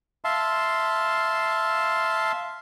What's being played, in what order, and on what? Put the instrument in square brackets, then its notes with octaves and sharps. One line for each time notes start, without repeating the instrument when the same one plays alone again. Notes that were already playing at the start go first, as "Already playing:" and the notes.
[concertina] E5 F5 A5 C6